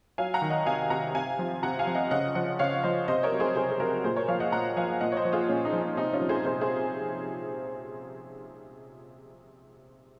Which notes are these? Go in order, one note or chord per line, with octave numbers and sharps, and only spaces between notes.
F#3 F5 G#5
F#5 A#5
D#3
D#5 F#5
C3 F5 G#5
C3 F#5 A#5
C3 F5 G#5
F3
C3 F#5 A#5
F5 G#5
F3
D#5 F#5
C#3 D#5 F#5
F3 D#5 F#5
C#3 C#5 F5
F3 C5 D#5
C3 C5 D#5
A#4 C#5
F#3
G#4 C5
C3 G#4 C5
G#4
F#3 F#4 A#4
A#2 G#4 C5
A#4 C#5
F3 C#5 F5
D#5 F#5
A#2 F#5 A#5
F3 F5 G#5
A#2 D#5 F#5
C#5
C5 D#5
F3
F4 G#4
A#2 C#4
D#4
F3
D#4
C3 D#4
C#4 F4
F3
G#4 C5
C3 G#4 C5
G#4 C5